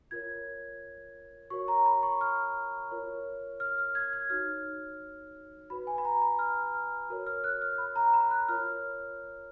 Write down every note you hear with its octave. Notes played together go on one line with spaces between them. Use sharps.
F4 A#4 C#5 G#6
F#4 A#4 C#5 C#6
A#5
B5
C#6
F6
F4 A#4 C#5
F6
F6
G#6
G#6
D#4 F#4 C#5 F6
F#4 B4 B5
G#5
B5
A#5
B5
F6
F6
F#4 A#4 C#5
F6
F#6
F6
B5
A#5
B5
F#6
F4 A#4 C#5 F6